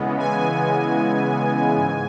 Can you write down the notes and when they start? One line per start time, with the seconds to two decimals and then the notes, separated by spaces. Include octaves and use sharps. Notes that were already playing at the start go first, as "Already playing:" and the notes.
Already playing: C#3 E3 G#3 B3
0.20 G#5
1.77 G#2